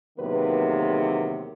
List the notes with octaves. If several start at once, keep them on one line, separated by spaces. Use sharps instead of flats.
E2 C3 D#3 F#3 A#3 B4